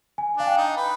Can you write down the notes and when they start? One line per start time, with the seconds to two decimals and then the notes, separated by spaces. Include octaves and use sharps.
0.18 G#5
0.37 D4 F5
0.47 G5
0.57 D#4
0.76 B4